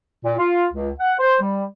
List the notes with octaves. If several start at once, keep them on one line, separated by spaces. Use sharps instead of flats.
A#2
F4
C#2
F#5
C5
G3